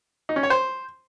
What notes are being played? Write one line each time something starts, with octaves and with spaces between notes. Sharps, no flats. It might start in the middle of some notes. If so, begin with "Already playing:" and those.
D#4
C#4
C#5
C5